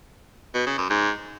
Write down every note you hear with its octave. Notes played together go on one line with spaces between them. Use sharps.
B2
C#3
F#2
G#2